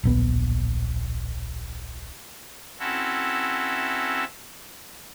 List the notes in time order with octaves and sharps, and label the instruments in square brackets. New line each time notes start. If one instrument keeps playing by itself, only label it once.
[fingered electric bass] D1 A#1 B3
[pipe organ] C4 C#4 E4 F#4 A4